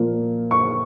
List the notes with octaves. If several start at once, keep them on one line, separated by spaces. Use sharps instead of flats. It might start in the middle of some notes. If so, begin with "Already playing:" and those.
Already playing: A#2 F3 A#3
C#6